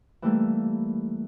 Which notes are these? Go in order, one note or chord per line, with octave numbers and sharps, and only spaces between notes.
E3 G3 A3 A#3